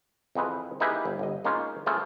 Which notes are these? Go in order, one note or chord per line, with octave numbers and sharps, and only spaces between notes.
F2 E3 C4 G#4 B4 F5
A#3 D#4 E4 G4 G#4 B4
G1
G1 D#5
G#3 A#3 C#4 D#4 F4 C#5
C#3 F3 A3 A#3 F4 G#4